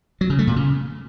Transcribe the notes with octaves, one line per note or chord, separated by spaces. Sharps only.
F#3
C#3
A3
A#2
C#3